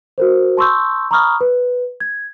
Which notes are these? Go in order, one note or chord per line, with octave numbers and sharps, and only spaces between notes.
F#4 A#4 C5
A5 C6 C#6 E6 G6
A#5 B5 C#6 D#6 F6
B4
G#6